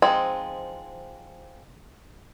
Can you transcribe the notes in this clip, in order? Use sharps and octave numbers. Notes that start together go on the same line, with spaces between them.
F3 G#3 C4 D#4